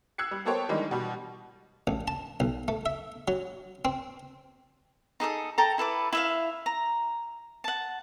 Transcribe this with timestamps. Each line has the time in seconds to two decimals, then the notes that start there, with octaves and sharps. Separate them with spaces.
0.18 E6 F#6 G#6 C7 C#7
0.31 G3
0.45 A#3 B3 A4 C5 C#5 G5
0.69 D#3 E3 G3 G#3 D4 D#4
0.91 B2 G3
1.87 A1
2.08 A5
2.40 B1
2.68 A3
2.86 E5
3.28 F#3
3.85 C4
5.20 D#4 G#4 A4 D#6
5.58 A4 G5 A#5
5.78 E4 A4 B4 D6
6.13 E4 E5 F5
6.66 A#5
7.64 F#5 A5